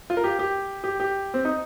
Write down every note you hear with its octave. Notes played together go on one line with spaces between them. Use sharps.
F4
A#4
G4
G4
G4
G4
C4
D#4